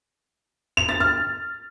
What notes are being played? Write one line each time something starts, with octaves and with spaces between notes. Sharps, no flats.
F7
A6
F6